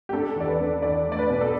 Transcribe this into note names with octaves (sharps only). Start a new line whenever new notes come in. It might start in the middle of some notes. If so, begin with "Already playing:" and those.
G4
D4 A4
E2 D5
B4
D4
E2 D5
A3
D5
B4
B2
A4